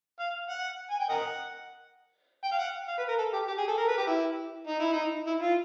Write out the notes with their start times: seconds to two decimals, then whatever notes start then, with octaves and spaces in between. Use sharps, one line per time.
0.20 F5
0.49 F#5
0.91 G#5
1.00 G5
1.09 A#4 D#5 F#5
2.44 G5
2.52 F5
2.58 F#5
2.88 F5
2.98 B4
3.08 A#4
3.18 A4
3.33 G4
3.48 G4
3.58 G#4
3.68 A4
3.78 A#4
3.88 B4
3.98 G4
4.07 E4
4.67 D#4
4.80 E4
4.92 D#4
5.27 E4
5.41 F4